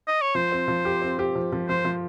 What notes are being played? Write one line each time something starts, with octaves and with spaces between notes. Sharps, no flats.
D#5
C#5
F3 C5
C4
F3
G4
C4
G4
F3
F3
F3 C5
F3